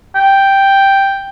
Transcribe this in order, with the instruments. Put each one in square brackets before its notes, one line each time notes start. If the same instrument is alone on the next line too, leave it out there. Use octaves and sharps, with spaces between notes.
[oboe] G5